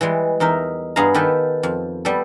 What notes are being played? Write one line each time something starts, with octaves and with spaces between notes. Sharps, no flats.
E3 G3 G#3
E2 D#4 A#4 E5
G2 B3 G#4 F5 A#5
D#3 G4 A4 B4 G#5
F2
G3 B3 G4 A4